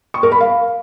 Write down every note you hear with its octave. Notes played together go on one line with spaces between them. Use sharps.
C#6
A#4
B5
F5